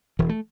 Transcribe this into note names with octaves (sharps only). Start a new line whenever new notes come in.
E1 E3
A3